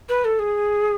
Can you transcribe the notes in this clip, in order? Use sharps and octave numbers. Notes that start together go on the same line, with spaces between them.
B4
A4
G#4